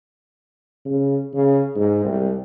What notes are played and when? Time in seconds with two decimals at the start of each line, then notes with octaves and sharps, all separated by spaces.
0.85 C#3
1.34 C#3
1.76 G#2
2.05 C2